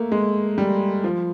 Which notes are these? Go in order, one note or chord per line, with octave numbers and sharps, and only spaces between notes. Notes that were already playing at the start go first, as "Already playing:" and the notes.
Already playing: A3 A#3
G#3
G3
F3